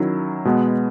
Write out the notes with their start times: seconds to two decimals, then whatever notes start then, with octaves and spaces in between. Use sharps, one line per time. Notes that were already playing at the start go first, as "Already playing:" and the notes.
Already playing: D#3 F#3 C#4 E4
0.45 B2 G#3 B3